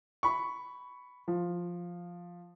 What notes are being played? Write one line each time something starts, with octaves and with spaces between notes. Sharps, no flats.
B5 C#6
F3